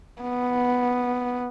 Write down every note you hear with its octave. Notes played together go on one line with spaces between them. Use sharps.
B3